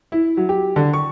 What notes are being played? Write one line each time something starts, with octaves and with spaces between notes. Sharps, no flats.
E4
F#3
G4
D3
C#6